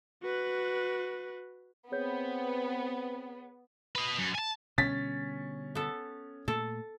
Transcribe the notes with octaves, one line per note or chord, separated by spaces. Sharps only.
F#4 B4
B3 C4 G#4 C#5 G6
B4 D#5
F#2
G#5 A5
B2 D3 G3 C#4 A6 B6
B3 A4
A#2 A3 A4